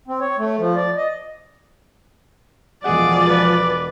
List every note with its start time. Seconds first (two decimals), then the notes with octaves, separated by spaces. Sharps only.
0.08 C4
0.21 C#5
0.38 A3
0.58 F3
0.76 D5
0.97 D#5
2.84 E1 F3 G#4 D5 F#5
3.28 B4